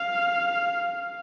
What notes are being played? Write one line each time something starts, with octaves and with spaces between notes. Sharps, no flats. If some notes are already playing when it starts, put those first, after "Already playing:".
Already playing: F5